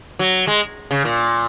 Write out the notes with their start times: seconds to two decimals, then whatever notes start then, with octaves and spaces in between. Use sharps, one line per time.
0.19 F#3
0.47 G#3
0.91 C#3
1.05 A#2